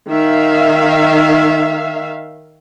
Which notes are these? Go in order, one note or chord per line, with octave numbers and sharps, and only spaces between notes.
D#3 E5 F5